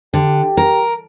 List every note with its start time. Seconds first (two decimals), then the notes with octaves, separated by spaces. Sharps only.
0.14 D3 G4
0.57 A#4